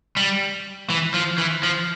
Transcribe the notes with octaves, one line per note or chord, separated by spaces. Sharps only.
G3
E3
F3
E3
F3